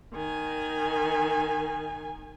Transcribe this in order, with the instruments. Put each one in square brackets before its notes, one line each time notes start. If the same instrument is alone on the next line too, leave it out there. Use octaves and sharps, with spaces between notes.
[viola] D#3 G#5